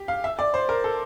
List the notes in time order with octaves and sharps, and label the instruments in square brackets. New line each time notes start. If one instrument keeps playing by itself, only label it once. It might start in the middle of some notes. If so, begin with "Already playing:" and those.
Already playing: [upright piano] G4
F5
E5
D5
C5
A#4
A4